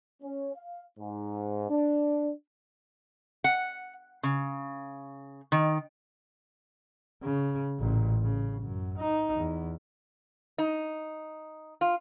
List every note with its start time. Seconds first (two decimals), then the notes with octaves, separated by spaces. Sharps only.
0.22 C#4
0.55 F5
0.98 G#2
1.70 D4
3.44 F#5
4.23 C#3
5.52 D#3
7.23 C#3
7.79 A1 A#2
8.23 C#3
8.63 F#2
8.99 D#4
9.36 E2
10.58 D#4
11.81 F4